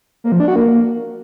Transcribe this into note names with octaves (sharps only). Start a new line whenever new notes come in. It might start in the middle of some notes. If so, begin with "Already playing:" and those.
A#3
F3
D4
F#4
A#3